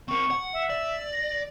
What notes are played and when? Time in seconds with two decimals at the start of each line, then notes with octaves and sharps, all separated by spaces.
0.08 C4 A#4 C#6
0.31 F#5
0.53 E5
0.70 D5
1.13 A#6